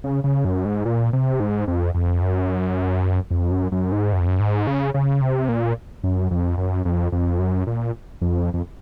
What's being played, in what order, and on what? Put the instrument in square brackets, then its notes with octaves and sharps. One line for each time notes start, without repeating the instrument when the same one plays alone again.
[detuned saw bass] C#3
C#3
F#2
G#2
A#2
C3
G#2
F2
F2
F#2
F2
F#2
F#2
G#2
F#2
F2
F#2
G#2
C#3
C#3
C3
A#2
F#2
F2
F#2
F2
F2
F#2
A#2
F2
F2